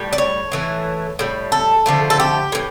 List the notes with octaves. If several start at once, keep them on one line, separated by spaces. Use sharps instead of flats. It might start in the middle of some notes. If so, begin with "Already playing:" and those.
Already playing: A2 G3
D5
C#5
A2 E3 A3
A2 G3
A4
D3 F3 A3
A4
G4
A2 E3